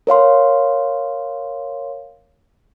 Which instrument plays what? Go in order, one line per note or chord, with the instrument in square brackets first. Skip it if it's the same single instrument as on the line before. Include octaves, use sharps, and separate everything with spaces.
[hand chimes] A#4 C#5 F5 C6